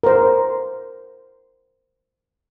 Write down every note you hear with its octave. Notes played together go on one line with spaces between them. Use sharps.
A#4 C5